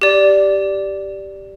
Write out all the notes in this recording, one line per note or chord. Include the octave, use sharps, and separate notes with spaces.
G4 D5